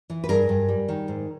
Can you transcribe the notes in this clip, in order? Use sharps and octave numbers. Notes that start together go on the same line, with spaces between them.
E3
B4
G2 G#4 A#4
G2
G3
D#3
G#2